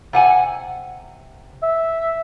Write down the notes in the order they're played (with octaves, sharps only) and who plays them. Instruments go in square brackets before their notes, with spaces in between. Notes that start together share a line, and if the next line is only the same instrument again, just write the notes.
[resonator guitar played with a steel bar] C3 F#5 G#5
[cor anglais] E5